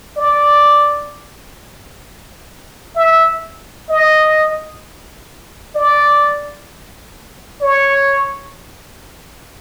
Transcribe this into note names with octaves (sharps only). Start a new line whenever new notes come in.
D5
E5
D#5
D5
C#5